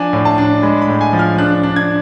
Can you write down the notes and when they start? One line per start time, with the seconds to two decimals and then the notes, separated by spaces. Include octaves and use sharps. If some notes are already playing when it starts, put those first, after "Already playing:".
Already playing: F3 D4 G#5
0.13 A2
0.25 A5
0.38 D4
0.63 G#3 B5
0.82 B5
0.88 A2
1.01 G#5
1.13 F3
1.19 F6
1.38 D4 F#6
1.63 D4
1.76 G#6